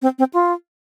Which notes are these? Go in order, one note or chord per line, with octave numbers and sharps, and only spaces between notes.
C4
C4
F4